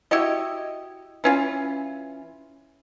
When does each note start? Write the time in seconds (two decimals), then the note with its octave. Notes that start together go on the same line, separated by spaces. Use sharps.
0.11 E4 F#4 G4 D#5
1.24 E3 C#4 F4